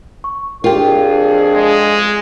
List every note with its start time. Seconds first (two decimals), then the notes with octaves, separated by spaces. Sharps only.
0.24 C#6
0.64 F2 D4 F4 G4 G#4 A#4 G5
1.53 G#3